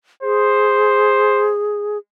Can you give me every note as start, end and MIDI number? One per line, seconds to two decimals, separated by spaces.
0.23 1.98 68
0.23 1.52 72